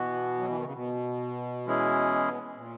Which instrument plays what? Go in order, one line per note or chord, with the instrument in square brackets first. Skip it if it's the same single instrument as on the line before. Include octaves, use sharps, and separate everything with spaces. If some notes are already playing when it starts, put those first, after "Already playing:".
Already playing: [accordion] B2 [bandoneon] E3 B3 F#4
[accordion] F#3
E3
D#3
C#3
B2
[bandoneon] E3 G#3 C#4 E4 G#4
[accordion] A#2